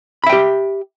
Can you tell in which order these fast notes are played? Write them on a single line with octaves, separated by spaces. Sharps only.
B5 E5 G5 G4